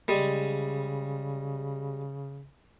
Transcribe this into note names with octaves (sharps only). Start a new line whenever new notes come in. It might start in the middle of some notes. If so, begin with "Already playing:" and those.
C#3 G3 G#3